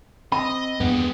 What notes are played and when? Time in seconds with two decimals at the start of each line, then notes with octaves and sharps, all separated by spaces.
0.32 C4 D#5 B5
0.80 E2 G2 G#3 A#3 B3 G4